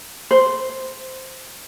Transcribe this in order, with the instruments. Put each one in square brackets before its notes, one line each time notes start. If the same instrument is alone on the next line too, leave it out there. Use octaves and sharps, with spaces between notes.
[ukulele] C5